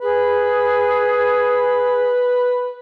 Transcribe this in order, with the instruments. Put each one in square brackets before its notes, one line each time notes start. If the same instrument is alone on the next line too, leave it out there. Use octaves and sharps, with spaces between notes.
[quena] G#4 [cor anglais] B4